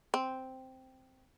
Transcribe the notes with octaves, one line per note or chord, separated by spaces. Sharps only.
C4